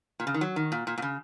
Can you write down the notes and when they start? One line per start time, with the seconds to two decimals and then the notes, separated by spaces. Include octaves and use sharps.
0.20 A#2
0.27 C#3
0.34 D#3
0.41 F#3
0.56 D#3
0.72 A#2
0.87 A#2
0.98 A#2
1.02 C#3